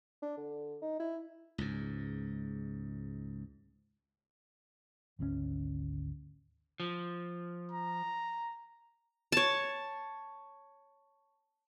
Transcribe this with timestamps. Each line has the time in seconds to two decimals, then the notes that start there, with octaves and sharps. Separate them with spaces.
0.22 D4
0.37 D3
0.82 D#4
1.00 E4
1.58 C#2 G#2
5.19 G#1 D2 B2 C#4
6.80 F3
7.72 A#5
9.32 C#5 A5